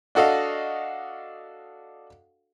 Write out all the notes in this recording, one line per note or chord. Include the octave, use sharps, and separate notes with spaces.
D4 F#4 A4 D#5 F5